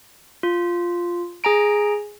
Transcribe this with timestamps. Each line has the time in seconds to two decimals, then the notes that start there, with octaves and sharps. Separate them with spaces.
0.43 F4
1.44 G#4 G#5 A#5 D7